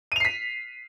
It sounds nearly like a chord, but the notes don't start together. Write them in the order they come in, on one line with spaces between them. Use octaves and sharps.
D#7 F7 C7 B6